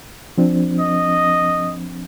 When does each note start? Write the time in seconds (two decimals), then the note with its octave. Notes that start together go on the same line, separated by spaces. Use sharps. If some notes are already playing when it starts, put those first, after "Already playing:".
0.38 F3 C4 D4
0.79 D#5